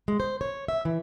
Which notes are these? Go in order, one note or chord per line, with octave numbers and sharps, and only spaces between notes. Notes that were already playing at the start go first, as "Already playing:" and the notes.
G#3
C5
C#5
E5
E3